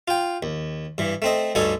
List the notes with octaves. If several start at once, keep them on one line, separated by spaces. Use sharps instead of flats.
F4 G5
D#2
G2 E3
A3 C4 D#5
D2 G2 D#4 A4 C#5 G#5